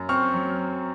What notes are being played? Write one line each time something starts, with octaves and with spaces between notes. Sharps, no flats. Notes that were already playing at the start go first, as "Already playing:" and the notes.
Already playing: F#2
C4 C#6 F6
F#3